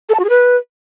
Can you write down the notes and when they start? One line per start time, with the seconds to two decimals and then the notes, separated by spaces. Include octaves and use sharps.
0.09 A4
0.14 A5
0.19 F#4
0.24 G#4
0.29 B4